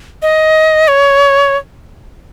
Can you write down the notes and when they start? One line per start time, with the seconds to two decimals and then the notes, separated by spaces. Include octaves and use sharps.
0.22 D#5
0.88 C#5